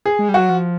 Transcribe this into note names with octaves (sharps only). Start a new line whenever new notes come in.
G#4
G#3
G3
F#3 F#4
F3